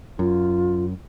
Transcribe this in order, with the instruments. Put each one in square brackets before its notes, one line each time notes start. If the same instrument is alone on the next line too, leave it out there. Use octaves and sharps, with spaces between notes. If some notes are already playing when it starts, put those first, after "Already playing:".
[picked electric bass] F#2 [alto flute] F4